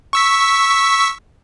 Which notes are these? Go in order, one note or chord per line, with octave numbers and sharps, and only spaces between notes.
C#6 E6 B6